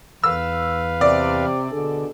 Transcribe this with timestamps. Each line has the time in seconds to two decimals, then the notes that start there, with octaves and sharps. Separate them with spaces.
0.24 E2 B4 F5 E6
1.01 C3 D5
1.72 B2 D3 G#4 A4